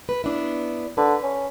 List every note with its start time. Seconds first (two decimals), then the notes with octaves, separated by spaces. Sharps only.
0.09 B4
0.24 B3 D4 E4
0.97 D3 B4
1.23 C#4